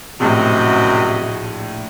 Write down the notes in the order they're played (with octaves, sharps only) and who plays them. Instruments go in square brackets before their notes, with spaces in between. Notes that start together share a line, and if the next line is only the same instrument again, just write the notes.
[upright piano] A#1 A2 [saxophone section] F#2 C3 [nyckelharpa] F#4 D#5